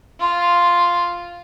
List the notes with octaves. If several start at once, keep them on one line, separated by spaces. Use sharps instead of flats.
F4